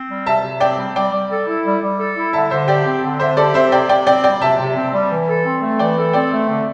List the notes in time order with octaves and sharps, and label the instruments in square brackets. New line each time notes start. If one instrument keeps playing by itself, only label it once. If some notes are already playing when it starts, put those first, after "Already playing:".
Already playing: [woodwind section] C4
G3
[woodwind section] C3 [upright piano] E5 A5
[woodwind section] C3
[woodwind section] C4 [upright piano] D5 G5
[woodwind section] G3
[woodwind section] G3 [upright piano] D5 G5
[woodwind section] G3
A4
E4
G3
G3
A4
E4
[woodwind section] D3 [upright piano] E5 A5
[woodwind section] D3 [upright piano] C5 E5
[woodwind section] G4 [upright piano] D5 G5
[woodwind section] C4
D3
[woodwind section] D3 [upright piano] C5 E5
[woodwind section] G4 [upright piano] A4 D5
[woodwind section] C4 [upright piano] C5 E5
[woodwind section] C3 [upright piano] D5 G5
[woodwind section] C3 [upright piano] D5 G5
[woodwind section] C4 [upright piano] D5 G5
[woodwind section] G3 [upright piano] D5 G5
[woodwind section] C3 [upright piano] E5 A5
[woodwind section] C3
C4
G3
E3
A4
C4
A3
[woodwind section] E3 [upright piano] D5 G5
[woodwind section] A4
[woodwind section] C4 [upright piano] D5 G5
[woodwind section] A3
D3